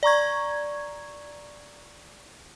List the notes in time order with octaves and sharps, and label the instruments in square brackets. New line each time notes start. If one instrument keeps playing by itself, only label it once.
[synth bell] D5 A#5 C#6 G#6